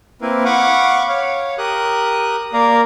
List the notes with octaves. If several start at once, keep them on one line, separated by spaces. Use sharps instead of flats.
A#3 C4 E4 A#4 B4
F5 F#5 B5 C#6 D6
C#5 F5
G4 A#4 D#6 F#6
A#3 A#4 D5 F5 A#5